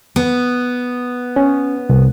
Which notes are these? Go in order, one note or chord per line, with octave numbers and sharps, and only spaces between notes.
B3
C#4
C2